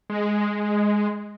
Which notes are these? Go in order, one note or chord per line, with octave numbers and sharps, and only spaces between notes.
G#3